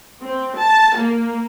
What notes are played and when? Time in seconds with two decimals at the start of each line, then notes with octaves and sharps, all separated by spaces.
0.24 C4
0.58 A5
0.97 A#3